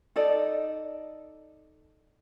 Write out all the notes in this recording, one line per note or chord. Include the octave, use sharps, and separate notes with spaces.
D#4 A4 D5 D#5